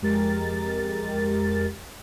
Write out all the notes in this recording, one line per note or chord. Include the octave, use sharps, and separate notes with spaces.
F2 G#3 G4 A#4 A6